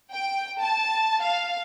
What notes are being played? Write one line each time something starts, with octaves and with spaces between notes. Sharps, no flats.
G5
A5
F5